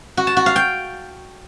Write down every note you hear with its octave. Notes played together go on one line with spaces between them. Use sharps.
F#4
A5
F#4
F5
G5